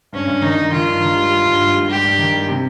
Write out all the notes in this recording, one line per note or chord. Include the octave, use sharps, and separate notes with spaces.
G2 C#4
G2
D#3 D#4
D#3
D#3 F4
G2
D#3
G3
G3
G2
G2
G3
G3 G4
G2
D#3
G3
C3